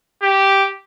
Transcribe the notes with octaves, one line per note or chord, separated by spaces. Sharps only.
G4